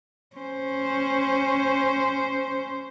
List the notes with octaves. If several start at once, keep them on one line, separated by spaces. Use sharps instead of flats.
C#4 C5